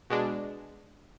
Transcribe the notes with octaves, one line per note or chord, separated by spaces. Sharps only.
B2 G#3 D4